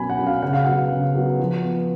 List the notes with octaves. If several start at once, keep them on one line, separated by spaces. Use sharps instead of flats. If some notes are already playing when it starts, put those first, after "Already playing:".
Already playing: B2 F#3 C#4 G#5 B5
F#5
F#3 C#4
F5
C#3 F#5
F5
F#3 B3 F#5
C#3
F#3 B3
F3
B3